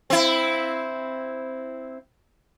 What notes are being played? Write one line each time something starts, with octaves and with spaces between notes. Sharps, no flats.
C4 E4